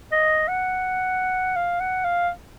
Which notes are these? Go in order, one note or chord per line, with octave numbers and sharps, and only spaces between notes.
D#5
F#5
F5
F#5
F5